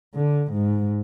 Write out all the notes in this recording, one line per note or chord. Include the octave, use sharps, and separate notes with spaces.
D3
G#2